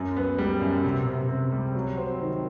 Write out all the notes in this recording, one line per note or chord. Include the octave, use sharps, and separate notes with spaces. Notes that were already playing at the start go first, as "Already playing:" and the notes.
Already playing: F#2
B3
G3
F#2
C3
C3
C3
G3
F#3
C4
D#3